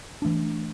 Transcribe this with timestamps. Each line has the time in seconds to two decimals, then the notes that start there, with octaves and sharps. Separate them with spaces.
0.22 E3 A3 D4